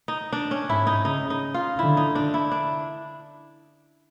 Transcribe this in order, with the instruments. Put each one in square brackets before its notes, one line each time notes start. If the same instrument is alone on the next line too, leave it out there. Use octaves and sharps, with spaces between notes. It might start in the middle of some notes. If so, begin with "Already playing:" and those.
[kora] D#4
D4
C#4
[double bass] G#2 [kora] E4
[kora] D#4
[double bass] C#3 [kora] D#4
[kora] D#4
F4
[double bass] D3 [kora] E4
[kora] D#4
D4
E4
D4